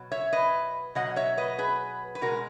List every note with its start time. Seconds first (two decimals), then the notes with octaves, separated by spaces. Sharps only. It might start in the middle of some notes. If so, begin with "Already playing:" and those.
Already playing: B2 F#3
0.12 C#5 E5
0.33 B4 D#5
0.95 B2 F#3 D#5 F#5
1.16 C#5 E5
1.38 B4 D#5
1.58 G#4 B4
2.15 B4
2.21 B2 G#3 F#4 A#4